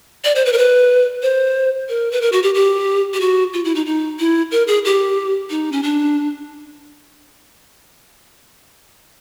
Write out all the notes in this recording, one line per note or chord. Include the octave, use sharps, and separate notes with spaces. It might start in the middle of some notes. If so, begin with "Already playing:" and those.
D5
C5
B4
A#4
B4
C5
A#4
B4
A#4
F#4
G4
G4
G4
F#4
F4
E4
D#4
D#4
E4
A#4
G#4
G4
D#4
C#4
D4